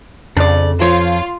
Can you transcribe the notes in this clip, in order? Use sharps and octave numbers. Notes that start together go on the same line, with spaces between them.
F2 C#3 D4 D5
F3 F4 C#5